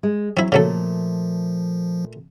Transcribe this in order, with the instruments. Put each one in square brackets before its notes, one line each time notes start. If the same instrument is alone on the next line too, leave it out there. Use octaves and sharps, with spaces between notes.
[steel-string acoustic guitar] G#3
[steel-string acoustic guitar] F#3 [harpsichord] C4 E4
[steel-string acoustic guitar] A#2 A3 [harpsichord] C#3 F#3 A4 [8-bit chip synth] F3